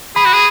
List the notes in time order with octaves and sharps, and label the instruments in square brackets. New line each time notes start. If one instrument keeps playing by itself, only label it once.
[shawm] G#4 [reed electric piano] B5
[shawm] F#4
G#4